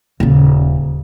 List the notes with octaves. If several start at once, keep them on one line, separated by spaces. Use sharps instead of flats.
D#1 C#3